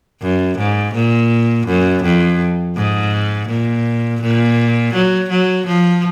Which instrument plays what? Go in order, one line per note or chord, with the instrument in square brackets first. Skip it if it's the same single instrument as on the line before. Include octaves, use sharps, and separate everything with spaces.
[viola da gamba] F#2
G#2
A#2
F#2
F2
G#2
A#2
A#2
F#3
F#3
F3